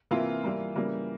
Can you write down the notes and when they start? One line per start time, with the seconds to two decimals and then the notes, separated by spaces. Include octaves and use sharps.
0.11 C3 E3 A#3 F4
0.44 E3 G3 A#3
0.76 C#3 E3 G3 A#3